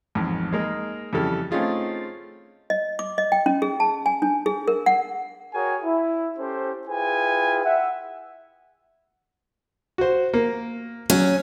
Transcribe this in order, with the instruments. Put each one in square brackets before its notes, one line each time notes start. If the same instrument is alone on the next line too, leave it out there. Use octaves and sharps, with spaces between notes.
[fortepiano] A1 F2 G#2
G#3 A#3 D#4
F2 C#3 E3 G3 A4 F6
A3 C4 C#4 D#4 F4 G#4
[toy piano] D#5
D6
D#5
G5
C#4
G#4
A5
G#5
D4
G#4
A#4
F#5
[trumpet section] F#4 G#4 A#4 C#5 G5 G#5
E4
C#4 G4 A4 C5
E4 F4 G#4 B4 G5 G#5
E5 F#5
[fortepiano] F#4 C5
A#3
[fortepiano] F#3 [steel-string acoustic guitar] C#4